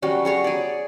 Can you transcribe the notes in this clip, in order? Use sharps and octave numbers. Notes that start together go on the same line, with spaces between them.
F#3 G3 C#4
F#3 G#4 C#5
G#4 D5